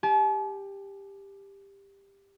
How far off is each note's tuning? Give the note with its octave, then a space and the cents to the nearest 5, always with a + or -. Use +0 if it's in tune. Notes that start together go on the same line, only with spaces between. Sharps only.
G4 +15 A5 -45